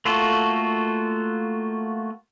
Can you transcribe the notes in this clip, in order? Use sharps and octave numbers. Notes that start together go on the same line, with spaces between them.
A3 A#3 F4 F#4 A4